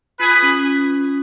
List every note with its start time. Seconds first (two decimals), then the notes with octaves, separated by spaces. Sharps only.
0.20 F4 G#4 B4
0.42 C#4